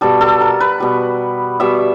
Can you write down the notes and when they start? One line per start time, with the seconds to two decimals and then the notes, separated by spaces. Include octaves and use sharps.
0.01 B2 G3 A4
0.21 A4
0.41 A#4
0.60 B4
0.80 B2 G3
1.60 B2 G3 E5